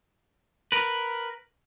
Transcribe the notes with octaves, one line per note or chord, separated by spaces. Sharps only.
A#4 B4